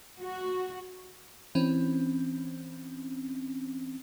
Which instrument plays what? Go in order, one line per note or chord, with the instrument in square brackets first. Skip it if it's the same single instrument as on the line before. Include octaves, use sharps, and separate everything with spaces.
[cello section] F#4
[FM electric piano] E3 C4 C#4